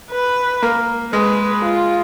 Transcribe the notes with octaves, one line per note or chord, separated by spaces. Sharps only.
B4
A#3
G#3 B4
F4